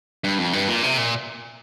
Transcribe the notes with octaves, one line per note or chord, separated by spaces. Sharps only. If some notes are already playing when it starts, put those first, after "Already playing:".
G2
F2
G2
A#2
C3
A#2